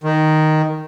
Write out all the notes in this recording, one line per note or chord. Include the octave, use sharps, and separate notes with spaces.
D#3